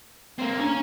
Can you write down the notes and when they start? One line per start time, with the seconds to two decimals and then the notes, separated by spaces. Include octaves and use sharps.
0.39 A#3 C4
0.59 C#4 D4 A#5